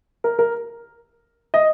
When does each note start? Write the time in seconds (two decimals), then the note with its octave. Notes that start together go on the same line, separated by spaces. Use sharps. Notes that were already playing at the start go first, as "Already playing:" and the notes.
0.24 A#4
0.39 A#4
1.54 D#5